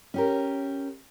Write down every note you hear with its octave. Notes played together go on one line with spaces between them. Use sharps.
C#4 G4 A#4